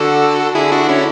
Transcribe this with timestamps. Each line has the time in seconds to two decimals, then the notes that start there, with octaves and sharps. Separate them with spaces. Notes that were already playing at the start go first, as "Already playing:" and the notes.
Already playing: D3 F#4 A4
0.55 D3 E4 G#4
0.72 D4 F#4
0.89 C#4 E4